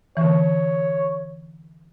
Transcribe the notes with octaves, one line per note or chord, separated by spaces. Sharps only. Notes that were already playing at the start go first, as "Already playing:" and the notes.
D3 E3 C#5